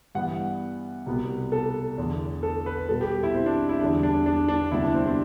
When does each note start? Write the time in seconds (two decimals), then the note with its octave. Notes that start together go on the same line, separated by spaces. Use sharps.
0.15 G2 E3 B3 F#5
1.06 C2 B2 G3 B3
1.52 A4
1.98 E2 D3 A3
2.43 A4
2.66 B4
2.88 B2 G3 B3 A4
3.01 G4
3.23 E4
3.34 C4
3.46 D4
3.69 E4
3.80 E2 D3 G3 D4
4.03 D4
4.26 D4
4.48 D4
4.71 D2 C3 G3 B3 E4
4.83 D4
4.95 C4
5.06 D4